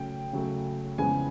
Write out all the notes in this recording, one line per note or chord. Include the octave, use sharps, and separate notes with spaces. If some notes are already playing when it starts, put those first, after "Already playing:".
Already playing: C#3 F#3 A3 G5
C#3 F#3 A3
F2 C#3 E3 G#3 B3 G#5